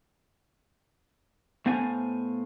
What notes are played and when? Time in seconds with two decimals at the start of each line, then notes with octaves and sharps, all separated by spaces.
1.66 A2 B3 C5 F5 G#5